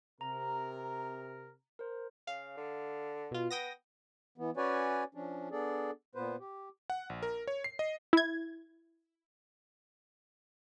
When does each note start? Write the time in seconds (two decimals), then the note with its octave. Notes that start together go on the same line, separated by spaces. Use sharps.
0.21 C3 A#4 A#5
1.79 A#4 C5
2.27 C#3 F5
2.57 D3
3.31 B2 F4
3.51 B3 G5 D#6 A#6
4.38 E3 B3
4.57 C#4 F#4 B4 C#5 D5 G#5
5.15 F3 C#4 D4
5.51 B3 D4 G#4 A4 D5
6.15 A#2 B3 B4 C5
6.40 G4
6.90 F#5
7.10 A#1
7.23 A#4
7.47 C#5
7.64 C7
7.79 D#5
8.13 E4 G#6